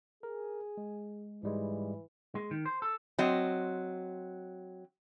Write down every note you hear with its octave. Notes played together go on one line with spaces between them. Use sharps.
G#4 A#4
G#3
G#2 E3 G3 G#3
G#3
D#3
C5
A4
F#3 C4 D#5